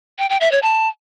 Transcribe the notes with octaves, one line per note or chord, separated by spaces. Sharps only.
G5
G5
E5
C#5
A5